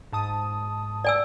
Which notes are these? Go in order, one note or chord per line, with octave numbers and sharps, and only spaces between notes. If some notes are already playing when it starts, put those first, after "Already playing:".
G#2 A5 D#6
D5 G#5 E6